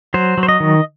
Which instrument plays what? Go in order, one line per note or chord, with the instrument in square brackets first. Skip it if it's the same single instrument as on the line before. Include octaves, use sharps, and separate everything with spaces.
[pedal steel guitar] F#3 C5
F#3
C5
D#5
D#3